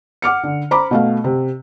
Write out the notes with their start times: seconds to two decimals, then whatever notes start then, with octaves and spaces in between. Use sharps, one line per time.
0.22 F#5 D6 F6 C#7
0.44 D3
0.71 C5 A#5 B5 D6
0.91 B2 A3 F5
1.24 C3